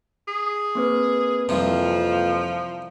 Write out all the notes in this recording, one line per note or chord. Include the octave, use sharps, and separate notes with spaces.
G#4
A#3 C4 B4
C2 F2 E3 F3